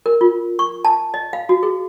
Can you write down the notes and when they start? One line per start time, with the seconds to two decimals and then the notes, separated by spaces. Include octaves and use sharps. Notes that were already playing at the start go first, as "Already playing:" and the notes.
0.06 A#4
0.21 F4
0.59 C#6
0.85 A5
1.14 D#5
1.33 F5
1.49 F#4
1.63 G#4